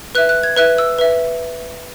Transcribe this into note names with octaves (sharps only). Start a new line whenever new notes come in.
B4 E5 F#6
F#6
G#6
B4 E5 F#6
E6
B4 E5